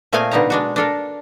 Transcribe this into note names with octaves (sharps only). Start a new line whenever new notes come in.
A#2 A3 C4 D#5 F5 G#5
B2 D3 G3 D#4 A#5
G#3 D4 F#4
D4 A4 A#4